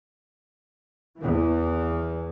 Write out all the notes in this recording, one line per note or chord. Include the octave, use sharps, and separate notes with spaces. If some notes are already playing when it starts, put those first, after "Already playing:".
E2 E3